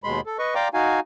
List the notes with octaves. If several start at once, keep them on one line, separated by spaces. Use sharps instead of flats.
D#2 B2 G#3 B5 C6
A4
B4 D#5 C#6
D5 F5 G5 A#5 C6 D6
D#4 F#4 F5 G#5